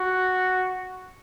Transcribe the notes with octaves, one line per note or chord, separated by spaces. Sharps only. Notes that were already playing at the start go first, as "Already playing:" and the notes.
Already playing: F#4